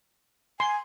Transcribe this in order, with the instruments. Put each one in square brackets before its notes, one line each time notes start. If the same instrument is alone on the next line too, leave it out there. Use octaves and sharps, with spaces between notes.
[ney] G#5 [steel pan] C6